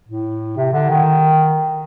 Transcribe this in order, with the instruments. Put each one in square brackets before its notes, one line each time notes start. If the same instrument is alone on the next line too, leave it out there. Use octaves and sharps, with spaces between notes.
[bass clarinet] A2
C3
D3
D#3